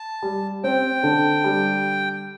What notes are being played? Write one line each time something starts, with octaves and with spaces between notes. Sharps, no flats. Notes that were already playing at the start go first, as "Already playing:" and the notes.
Already playing: A5
G3
C4 G5
D3
G3